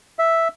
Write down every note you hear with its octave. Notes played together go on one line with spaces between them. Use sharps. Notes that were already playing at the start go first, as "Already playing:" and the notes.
E5